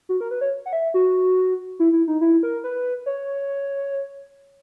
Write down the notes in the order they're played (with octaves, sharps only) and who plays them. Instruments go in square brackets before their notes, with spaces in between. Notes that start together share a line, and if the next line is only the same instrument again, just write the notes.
[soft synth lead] F#4
A#4
B4
C#5
F#5
E5
F#4
E4
E4
D#4
E4
A#4
B4
C#5